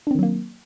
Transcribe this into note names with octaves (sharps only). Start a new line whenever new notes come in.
D#3 F#3 A#3 C4 D4